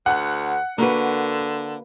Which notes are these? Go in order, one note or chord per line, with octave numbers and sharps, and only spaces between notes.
D2 F#5 F#6
D3 A#3 F#4 B4